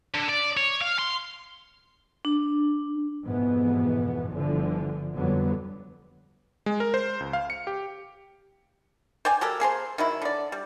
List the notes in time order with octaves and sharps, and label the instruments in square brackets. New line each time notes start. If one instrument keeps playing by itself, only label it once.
[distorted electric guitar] D3
D5
C#5
F5
C6
[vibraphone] D4
[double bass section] F2 G#2 B2 E3 B3
G1 D3 E3 F3
F2 D3 F#3 G3 B3
[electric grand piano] G#3
A#4
C5
C#2
F5
C#7
G4
[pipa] C5 D5 G5 G#5
F#3 G4 A4 A#4
A#3 G#4 A#4 C5
D#3 F#3 E4
D3 D5
G3